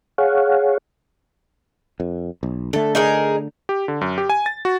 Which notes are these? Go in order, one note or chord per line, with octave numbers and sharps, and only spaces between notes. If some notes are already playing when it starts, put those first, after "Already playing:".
G#4 C#5 F5 F#5
F2
B1
D3 A3 A4
D#4 G#4 A#4
G4
D3
F#2
G4
G#5
A6
F#4